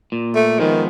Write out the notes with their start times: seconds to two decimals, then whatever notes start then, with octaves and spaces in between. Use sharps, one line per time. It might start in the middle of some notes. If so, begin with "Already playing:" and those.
0.12 A#2
0.35 A3
0.59 D#3 F3 G#3 B3